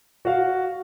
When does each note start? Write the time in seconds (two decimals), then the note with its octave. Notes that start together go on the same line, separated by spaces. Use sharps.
0.25 F#4 F5